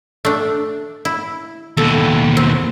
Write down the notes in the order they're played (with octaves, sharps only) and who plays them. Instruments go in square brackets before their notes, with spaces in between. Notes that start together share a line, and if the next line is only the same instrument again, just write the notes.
[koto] A3 D4
E4
[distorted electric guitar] D#2 B2 [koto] A4
[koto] C4